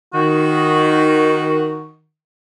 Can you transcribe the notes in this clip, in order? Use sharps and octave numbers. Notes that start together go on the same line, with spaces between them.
D#3 F#4